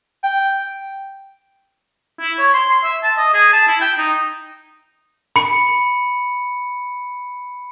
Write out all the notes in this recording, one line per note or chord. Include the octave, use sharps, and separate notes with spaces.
G5
E4
C#5
C6
C6
E5
A5
D#5
G#4
A5
E4
G5
D#4
B5 C#7